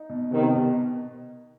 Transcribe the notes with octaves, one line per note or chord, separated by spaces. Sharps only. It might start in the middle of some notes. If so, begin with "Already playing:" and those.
Already playing: D#4
B2
C3 D#3 B3
B2